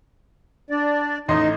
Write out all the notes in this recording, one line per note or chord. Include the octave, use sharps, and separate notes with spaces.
D4 D5
A1 D#4 D#5 C6